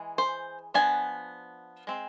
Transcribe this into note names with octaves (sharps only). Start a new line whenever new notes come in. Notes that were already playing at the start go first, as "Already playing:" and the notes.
Already playing: E3 G#3
C5
F3 B3 D4 G#5
G#3 C4